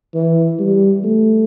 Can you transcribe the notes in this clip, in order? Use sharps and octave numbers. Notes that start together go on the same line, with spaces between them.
E3
G3
A3